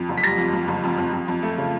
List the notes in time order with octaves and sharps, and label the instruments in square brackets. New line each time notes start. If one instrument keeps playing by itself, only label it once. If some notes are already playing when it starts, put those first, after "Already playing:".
Already playing: [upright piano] F2
F#1
B6
G3 A#6
F2
F2
F#1
F2
F2
F2
F2
A3
C#3